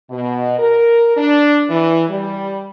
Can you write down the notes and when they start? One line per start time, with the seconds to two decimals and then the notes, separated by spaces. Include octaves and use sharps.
0.11 B2
0.59 A#4
1.17 D4
1.70 E3
2.10 G3